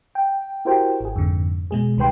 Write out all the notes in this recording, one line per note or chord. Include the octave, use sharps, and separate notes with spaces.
G5
E4 F#4 G4 A#4 C5 G5
G#1 G#4
F2 G#2 D3
B2 G#3 G#4
C#2 D#3 G3 B4 G5 C6